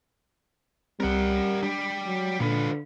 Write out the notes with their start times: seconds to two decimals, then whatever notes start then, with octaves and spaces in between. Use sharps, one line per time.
1.00 C2 G3 C4 A#4 F#5
1.63 D4 G4 D5
2.06 F#3
2.40 A#2 D3 F4 B4